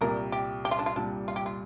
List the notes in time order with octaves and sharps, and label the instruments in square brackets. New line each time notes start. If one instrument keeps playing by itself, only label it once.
[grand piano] C2 A#2 G3 [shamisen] A#4
[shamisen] G4
G4
F4
D4
F4
[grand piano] C2 A#2 G3 [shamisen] D4
[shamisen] F4
G4
F4